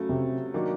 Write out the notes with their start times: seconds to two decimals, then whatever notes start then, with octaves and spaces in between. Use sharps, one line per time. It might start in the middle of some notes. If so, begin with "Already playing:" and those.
Already playing: C#3 F#3 A3
0.09 C3
0.54 D#3 F#3 A#3 D4